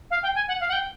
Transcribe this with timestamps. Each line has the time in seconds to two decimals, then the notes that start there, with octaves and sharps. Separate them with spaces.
0.10 F5
0.22 G5
0.35 G#5
0.48 F#5
0.60 F5
0.68 F#5
0.72 G5